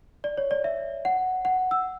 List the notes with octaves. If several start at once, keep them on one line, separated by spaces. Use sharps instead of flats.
D5
C#5
D5
E5
F#5
F#5
E6